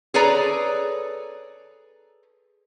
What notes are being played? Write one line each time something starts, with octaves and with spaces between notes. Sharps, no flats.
G#4 A4 B4 C#5 D5 A#5